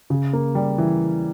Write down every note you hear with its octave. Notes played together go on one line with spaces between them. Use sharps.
C#3
A#3
G3
E3